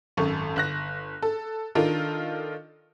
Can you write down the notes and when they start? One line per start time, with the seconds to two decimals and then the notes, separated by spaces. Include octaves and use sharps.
0.17 G#1 F#2 A4 C#6
0.56 G1 F#6 A#6
1.22 A4
1.75 D#3 D4 F4 A4 A#4